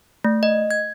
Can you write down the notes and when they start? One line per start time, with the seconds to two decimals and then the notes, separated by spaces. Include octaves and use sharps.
0.25 A3
0.43 D#5
0.71 G#6